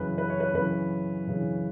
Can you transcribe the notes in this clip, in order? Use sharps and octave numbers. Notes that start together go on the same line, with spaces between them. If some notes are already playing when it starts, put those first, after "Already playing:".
Already playing: F#2 C#3 E3 B4
B4
C#5
B4
F#2 C#3 E3 B4
F#2 C#3 E3